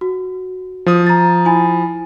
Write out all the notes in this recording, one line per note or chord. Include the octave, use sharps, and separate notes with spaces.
F#4
F3 D#6
A#5 A6
E4 G#5 B5